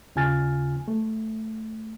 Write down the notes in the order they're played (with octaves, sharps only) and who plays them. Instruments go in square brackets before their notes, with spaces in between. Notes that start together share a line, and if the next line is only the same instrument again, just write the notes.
[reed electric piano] D#2 C#3 F4 G#5 F6 A6
A3